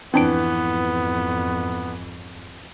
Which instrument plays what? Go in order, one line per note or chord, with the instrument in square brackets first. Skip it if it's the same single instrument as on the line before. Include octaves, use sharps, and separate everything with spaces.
[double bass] F2 G#2 [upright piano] E3 [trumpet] B3 [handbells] C4 D4 D7